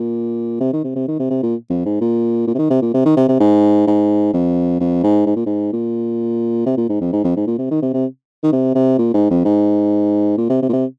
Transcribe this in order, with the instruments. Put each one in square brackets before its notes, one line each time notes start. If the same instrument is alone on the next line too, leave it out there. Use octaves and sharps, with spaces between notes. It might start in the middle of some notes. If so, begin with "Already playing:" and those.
Already playing: [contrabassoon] A#2
C3
D#3
C3
C3
D#3
C3
C3
A#2
F2
G#2
A#2
A#2
C3
D#3
C3
A#2
C3
D#3
C3
C3
G#2
G#2
F2
F2
G#2
G#2
A#2
G#2
A#2
C3
A#2
G#2
F2
G#2
F2
G#2
A#2
C3
D#3
C3
C3
D#3
C3
C3
A#2
G#2
F2
G#2
A#2
C3
C3
A#2
C3